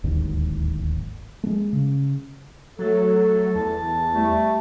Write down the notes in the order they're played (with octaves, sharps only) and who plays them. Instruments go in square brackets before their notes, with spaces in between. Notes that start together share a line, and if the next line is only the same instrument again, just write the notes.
[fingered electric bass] D1 G#1 D#2 G#2
G#3 A3
C#3
[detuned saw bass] F#3 [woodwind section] A3 A4
[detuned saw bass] E2 [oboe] A5
[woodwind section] G3 A3